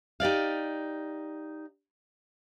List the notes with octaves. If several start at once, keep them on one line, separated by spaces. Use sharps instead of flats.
D#4 G4 D5 F5